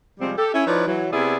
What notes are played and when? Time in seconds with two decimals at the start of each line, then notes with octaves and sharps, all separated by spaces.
0.20 C3 F3 G3 G#3 C4
0.37 G4 A4
0.54 C#4 E4 E5
0.67 F3 D#4 E4 B4 C#5 D5
0.87 E3 F#3
1.12 C3 B3 E4 G#4 D5 E5